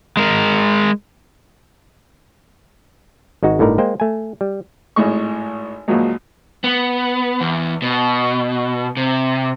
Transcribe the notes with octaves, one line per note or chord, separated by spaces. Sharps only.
G#3 A#4
G#1 G#3 D#4 F#4
G1 A2 D3 D#4 A#4
G#3 A#3 C5 G5
A3 G#5
G3
G#1 A2 G#3 C#6
A#1 D#2 F3 F#3 G#3
B3
E2
B2
C3